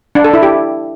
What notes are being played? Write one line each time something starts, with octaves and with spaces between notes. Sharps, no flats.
D4
A4
E4
G4